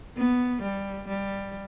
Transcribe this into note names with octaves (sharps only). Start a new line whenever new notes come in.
B3
G3
G3